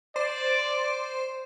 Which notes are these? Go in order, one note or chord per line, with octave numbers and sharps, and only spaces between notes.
C5 D5